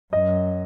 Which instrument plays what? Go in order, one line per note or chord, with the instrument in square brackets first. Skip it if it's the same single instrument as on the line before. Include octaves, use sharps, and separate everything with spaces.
[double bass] F#2 [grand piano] D#5